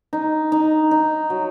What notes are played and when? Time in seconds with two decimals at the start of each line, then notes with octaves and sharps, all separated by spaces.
0.13 D#4
0.52 D#4
0.91 D#4
1.30 F#3